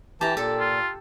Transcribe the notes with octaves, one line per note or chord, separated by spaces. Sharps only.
E3 G4 A5 A#5
A#2 A4
F4